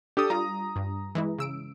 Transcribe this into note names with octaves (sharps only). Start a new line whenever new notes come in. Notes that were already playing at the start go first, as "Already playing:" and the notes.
D4 G4 A4 D#6
G3 F4 A#5
G2
E3 G#3 E4
C#3 E6 D7